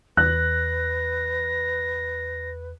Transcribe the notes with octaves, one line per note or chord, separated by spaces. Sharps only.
E2 B4 F#6 A#6